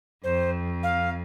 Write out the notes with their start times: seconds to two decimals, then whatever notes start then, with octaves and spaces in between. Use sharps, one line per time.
0.24 F2 C5
0.83 F5